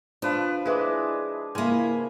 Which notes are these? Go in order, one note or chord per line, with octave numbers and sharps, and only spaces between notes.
F3 D4 B4 F5
G#3 E4 B4 D6
C#3 A#3 E4 F4 G#5